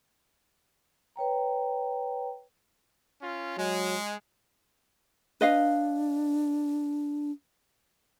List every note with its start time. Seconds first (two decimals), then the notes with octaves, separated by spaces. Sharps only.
1.16 B4 C#5 G5 A#5
3.21 C#4 F4
3.57 F#3 G#3
5.41 D4 B4 D#5 F5